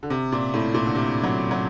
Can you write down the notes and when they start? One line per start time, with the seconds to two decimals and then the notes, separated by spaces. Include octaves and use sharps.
0.03 D3
0.10 C3
0.32 A#2
0.54 A2
0.74 A#2
0.86 D3
0.95 C3
1.24 F#3
1.51 F#3